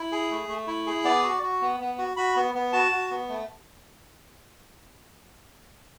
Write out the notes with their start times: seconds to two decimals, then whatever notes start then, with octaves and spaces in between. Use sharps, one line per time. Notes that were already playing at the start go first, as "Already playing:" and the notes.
Already playing: E4
0.12 G#4
0.31 A3
0.48 A3
0.67 E4
0.86 G#4
1.04 B3 D5
1.23 F#4
1.43 F#4
1.61 B3
1.80 B3
1.98 F#4
2.17 F#4 B5
2.36 B3
2.55 B3
2.73 F#4 A5
2.92 F#4
3.11 B3
3.29 A3